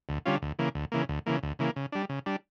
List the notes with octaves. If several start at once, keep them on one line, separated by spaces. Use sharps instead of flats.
D2
D3 G3 C#4 F4
D2
C#3 E3 A#3
D2
C#3 E3 A#3
D2
C#3 E3 A#3
D2
C#3 E3 A#3
C#3
G3 D4
C#3
G3 D4